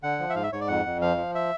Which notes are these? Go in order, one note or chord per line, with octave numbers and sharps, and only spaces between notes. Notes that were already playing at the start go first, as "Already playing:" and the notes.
D3 F#5
F3
E5
G#2 F5
E5
G#2 C#5
D5
F2 F#5
F2
F3 F5
F3
E5